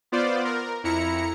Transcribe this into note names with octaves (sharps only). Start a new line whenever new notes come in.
B3 F4 C5 D5
A#4
F2 E4 A#5 C#7